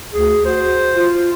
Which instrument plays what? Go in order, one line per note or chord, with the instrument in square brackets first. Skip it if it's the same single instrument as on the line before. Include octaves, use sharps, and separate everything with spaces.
[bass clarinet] D2 [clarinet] G#4
[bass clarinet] F#4 [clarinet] C5
[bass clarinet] F4